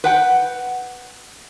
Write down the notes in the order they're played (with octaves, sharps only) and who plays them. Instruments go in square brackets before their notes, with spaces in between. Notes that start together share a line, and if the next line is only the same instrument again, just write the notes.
[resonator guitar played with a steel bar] B4 F#5 G5